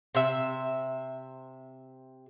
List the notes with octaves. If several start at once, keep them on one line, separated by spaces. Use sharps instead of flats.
C3 E5